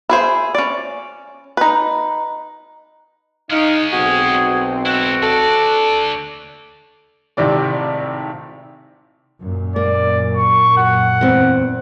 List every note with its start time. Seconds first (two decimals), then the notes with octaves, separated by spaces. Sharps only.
0.09 E4 G#4 C5
0.55 C#4 D5
1.57 D#4 B4
3.51 G#3 C#4 D#4 F5
3.93 B1 C4 F#4 G#4
4.86 G#2 E4 F#4
5.23 D2 A4 D5
7.37 G#1 A2 C3 C4 D5
9.41 F#2 A#2
9.76 A#3 D5
10.37 C#6
10.77 F#5
11.21 E2 C4